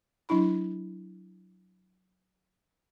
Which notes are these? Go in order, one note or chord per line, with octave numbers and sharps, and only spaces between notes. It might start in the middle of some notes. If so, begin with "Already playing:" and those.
F#3 D4 E4 B5